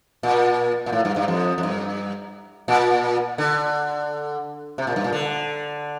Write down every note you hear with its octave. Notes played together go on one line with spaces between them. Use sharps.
A#2
A#2
A2
G2
G2
F2
F2
G2
A#2
D3
C3
A#2
G2
A#2
D3